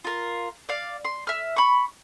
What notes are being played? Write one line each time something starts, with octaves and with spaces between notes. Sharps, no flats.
F4 A#4
D5 F5
C6
E5 F6
B5 C#6